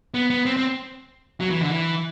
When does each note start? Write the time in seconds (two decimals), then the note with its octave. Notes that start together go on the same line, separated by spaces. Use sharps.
0.14 B3
0.30 B3
0.46 C4
0.57 C4
1.40 F#3
1.51 E3
1.61 D3
1.71 E3